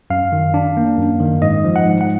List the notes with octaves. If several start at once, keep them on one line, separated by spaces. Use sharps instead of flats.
F#2 F5
D#3
D4
A#3
F#2
D#3
G#2 D#5
F3
F#5
G#2
F#5